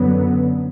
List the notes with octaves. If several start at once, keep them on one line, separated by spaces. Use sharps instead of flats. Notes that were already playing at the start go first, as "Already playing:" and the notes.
Already playing: F#2 D3 F#3 B3